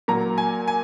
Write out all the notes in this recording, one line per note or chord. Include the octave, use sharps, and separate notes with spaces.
A#2 F#3 A#3 A#5
G#5
G#5